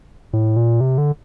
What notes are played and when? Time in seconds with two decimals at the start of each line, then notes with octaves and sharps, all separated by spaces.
0.33 A2
0.56 A#2
0.81 C3
0.98 D3